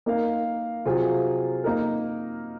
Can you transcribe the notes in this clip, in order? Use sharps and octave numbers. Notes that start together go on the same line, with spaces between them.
A#3 D#4 A#4 F5
C3 F#3 C4 F4 G#4
A#3 D#4 A#4